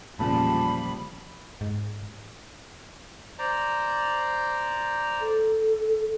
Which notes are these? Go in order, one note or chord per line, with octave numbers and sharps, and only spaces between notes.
E1 A#2 C#3 F3 G3 A5 B5
G#2
C5 D5 A#5
A4